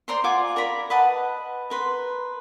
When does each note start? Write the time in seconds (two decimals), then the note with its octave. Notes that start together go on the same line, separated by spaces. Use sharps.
0.08 C5 D5 A#5 C6
0.24 F4 F#5 G#5 D6
0.56 A#4 D5 A#5 B5
0.90 B4 D#5 F#5 A5
1.70 A#4 B4 C6